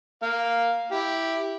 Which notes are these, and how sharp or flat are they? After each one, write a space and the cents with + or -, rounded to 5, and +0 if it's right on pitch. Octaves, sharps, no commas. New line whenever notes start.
A#3 +0 F5 +0
E4 +0 G4 +0